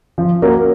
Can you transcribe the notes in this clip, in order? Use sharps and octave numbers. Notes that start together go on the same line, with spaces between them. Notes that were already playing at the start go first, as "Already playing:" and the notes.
F3
A#3 C#4 F#4 A#4